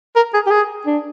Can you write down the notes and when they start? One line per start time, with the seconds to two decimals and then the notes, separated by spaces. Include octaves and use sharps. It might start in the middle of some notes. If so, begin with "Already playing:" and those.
0.16 A#4
0.34 G#4
0.46 G4
0.51 G#4
0.86 D4